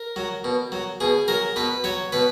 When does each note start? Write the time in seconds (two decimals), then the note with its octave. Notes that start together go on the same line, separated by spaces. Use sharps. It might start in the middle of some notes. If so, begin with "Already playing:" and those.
Already playing: A#4
0.16 F#3
0.44 B2
0.72 F#3
1.00 B2 G#4
1.28 F#3 A#4
1.56 B2 B4
1.84 F#3 C#5
2.12 B2 B4